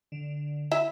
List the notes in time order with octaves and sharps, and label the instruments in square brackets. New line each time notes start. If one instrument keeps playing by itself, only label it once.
[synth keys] D3
[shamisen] E4 E5